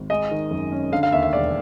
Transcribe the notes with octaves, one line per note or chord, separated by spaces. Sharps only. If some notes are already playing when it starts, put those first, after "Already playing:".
Already playing: G#1
G#3 D#5
D#3
F#2
C#4
D3 F5
F5
D#2 E5
E5
E1 D5